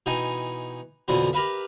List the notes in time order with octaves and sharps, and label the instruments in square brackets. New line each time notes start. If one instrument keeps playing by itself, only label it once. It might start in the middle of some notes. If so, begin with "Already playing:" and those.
[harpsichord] B2 E3 D#4 G5 G#5
F2 B2 D3 E3 C4
G4 A#4 B4 E5